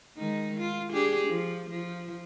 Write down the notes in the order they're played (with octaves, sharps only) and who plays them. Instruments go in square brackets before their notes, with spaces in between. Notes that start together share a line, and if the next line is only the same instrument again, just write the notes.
[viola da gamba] D#3 G#3 D#4
F4
D4 G4 G#4
F3
F3